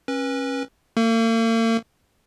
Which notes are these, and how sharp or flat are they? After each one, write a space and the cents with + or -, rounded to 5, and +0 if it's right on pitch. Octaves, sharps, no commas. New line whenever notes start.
C#4 -30 B4 -25
A#3 -40 A4 +45